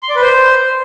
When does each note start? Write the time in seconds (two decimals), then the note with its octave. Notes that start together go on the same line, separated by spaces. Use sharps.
0.03 C6
0.09 D5
0.16 B4
0.22 C5